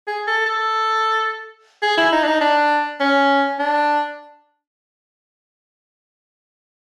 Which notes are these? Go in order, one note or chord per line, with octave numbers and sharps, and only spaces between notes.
G#4
A4
A4
G#4
E4
D#4
D4
D#4
D4
C#4
D4